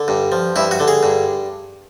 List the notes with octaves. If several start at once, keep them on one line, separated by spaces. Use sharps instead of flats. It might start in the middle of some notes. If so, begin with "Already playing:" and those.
Already playing: D3
G2
F3
G2 E4
F#4
D3
G#4
G2